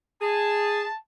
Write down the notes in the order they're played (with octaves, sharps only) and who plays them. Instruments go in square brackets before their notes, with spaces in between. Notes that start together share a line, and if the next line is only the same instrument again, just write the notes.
[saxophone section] G#4 [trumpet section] A5